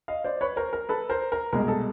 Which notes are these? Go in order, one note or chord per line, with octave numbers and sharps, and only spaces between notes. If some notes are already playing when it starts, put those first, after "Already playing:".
D#5 F5
C5 D5
B4 C#5
A#4 C5
A#4
A4 B4
A#4 C5
A#4
C2 B2 G#3 A#4
A4